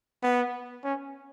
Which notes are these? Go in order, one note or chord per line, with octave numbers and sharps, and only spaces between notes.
B3
C#4